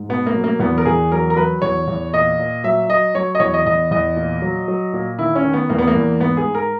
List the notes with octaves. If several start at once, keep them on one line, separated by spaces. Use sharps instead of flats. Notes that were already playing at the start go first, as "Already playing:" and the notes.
Already playing: G#2
B2 B3
A#3
F#3
A#3
E2 B3
A#4
E2 G#4
F#3 A#4
A#4
F#3 B4
E2 C#5
E2
A#2 D#5
A#2
F#3 E5
F#3 D#5
F#3 C#5
D#5
E2 C#5
D#5
E2 D#5
E2 D#5
A#2
F#3
F#3
A#2
D#3 E4
C#4
D#3
B3
E2 A#3
B3
A#3
E2
G#2 B3
G#4
G#2
A#4